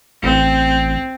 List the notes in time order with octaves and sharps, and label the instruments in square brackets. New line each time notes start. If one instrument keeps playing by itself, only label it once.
[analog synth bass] A1 [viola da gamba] C4